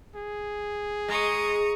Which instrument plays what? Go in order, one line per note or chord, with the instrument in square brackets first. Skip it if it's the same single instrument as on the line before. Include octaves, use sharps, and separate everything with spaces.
[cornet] G#4
[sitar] G#3 [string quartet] A#5 C#6 D#6